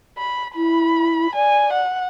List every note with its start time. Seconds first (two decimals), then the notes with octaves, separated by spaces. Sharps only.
0.18 B5
0.56 E4 B5
1.35 D5 G#5
1.73 F#5